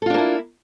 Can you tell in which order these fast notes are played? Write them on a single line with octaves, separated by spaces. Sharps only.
A4 F4 D4 A#3 E4